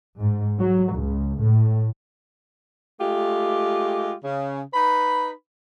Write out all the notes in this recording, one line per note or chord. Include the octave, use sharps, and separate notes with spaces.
G#2
F#3
C#2
A2
G#3 A3 F4 G4
C#3
D#4 B4 B5